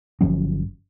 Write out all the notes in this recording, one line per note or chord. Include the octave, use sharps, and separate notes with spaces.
G1 F3 F#3 C#4